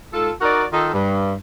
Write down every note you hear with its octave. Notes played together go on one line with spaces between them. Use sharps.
G#2 F4 A4
D#4 F#4 A#4 D5
D#3 D#4 F4 A4
G2